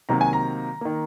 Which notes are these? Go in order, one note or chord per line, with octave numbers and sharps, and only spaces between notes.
C3 D#3 F#3 A#3 A#5
G#5
A#5
D#3 A#3